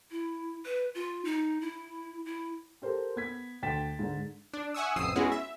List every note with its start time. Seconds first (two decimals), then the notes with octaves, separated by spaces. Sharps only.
0.11 E4
0.65 B4
0.95 F4
1.25 D#4
1.61 E4
2.26 E4
2.82 G4 A4 A#4 C5
3.16 B3 G#6 B6
3.62 D2 G5 A6 B6 E7
3.99 G#2 D3
4.53 D4
4.74 E5 F#5 G#5 C#6 D#6 E6
4.96 A1 F2 C3 D#6 E6 C7
5.15 G#3 B3 C#4 E4 F#4 G#4
5.32 E5